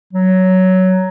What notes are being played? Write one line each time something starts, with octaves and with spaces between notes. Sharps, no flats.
F#3